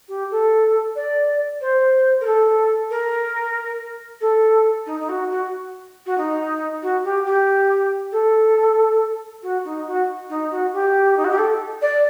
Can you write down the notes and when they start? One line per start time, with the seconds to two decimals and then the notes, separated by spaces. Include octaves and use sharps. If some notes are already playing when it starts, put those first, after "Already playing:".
0.08 G4
0.31 A4
0.95 D5
1.61 C5
2.21 A#4
2.26 A4
2.90 A#4
4.21 A4
4.86 D#4
5.00 D#4
5.09 F#4
5.30 F#4
6.06 F#4
6.17 D#4
6.82 F#4
7.04 G4
7.26 G4
8.12 A4
9.42 F#4
9.65 D#4
9.87 F#4
10.29 D#4
10.51 F#4
10.73 G4
11.17 D#4
11.24 F#4
11.31 G4
11.38 A4
11.82 D5